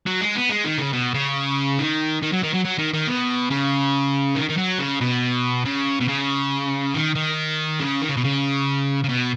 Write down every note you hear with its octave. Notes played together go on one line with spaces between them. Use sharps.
F#3
G#3
B3
G#3
D#3
C#3
B2
C#3
D#3
D#3
F#3
D#3
F#3
F#3
D#3
D#3
B2
C#3
D#3
D#3
F#3
C#3
B2
C#3
B2
C#3
D#3
D#3
C#3
D#3
C#3
B2
C#3
C#3
B2